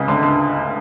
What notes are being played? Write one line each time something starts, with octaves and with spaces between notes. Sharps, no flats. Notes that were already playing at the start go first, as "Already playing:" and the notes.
Already playing: C#2 C#3
D2 D3
D3